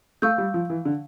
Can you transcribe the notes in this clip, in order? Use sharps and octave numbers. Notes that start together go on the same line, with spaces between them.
A3 F5 C#6 E6 G6
G3
F3
E3
D3